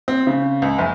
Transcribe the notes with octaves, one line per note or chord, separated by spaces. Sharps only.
C4
C#3
C#2
F#1